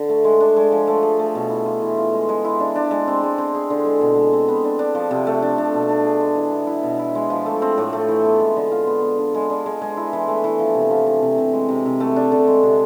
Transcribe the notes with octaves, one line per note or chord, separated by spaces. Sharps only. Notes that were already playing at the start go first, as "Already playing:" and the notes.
Already playing: D3
A3
G#3
D4
G#3
F3
A3
G#4
A3
B2
E4
F4
E3
F4
G#3
G#3
E4
D4
D4
G#3
C4
G#3
C4
G#4
D3
G#3
B2
G#3
C4
B3
D4
D4
F3
C3
A3
D4
D4
B2
D4
G#4
G#3
E3
B3
E4
B2
E4
G#3
F3
A3
C4
A2
A3
E3
B3
G#3
D3
F4
B3
B3
D4
G#3
D4
G#3
G#3
E4
E3
A3
E3
F3
C3
F3
E3
C3
C3
G#3
C3
C3
A3
D4
D3
G#3
C3